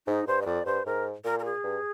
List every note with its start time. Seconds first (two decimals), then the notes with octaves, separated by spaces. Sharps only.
0.07 G#2 D#4
0.27 G2 C5
0.42 D#5
0.46 F2 D5
0.66 G2 C5
0.86 G#2 A#4
1.24 A#2 A#4
1.39 A#4
1.45 G#4
1.64 G2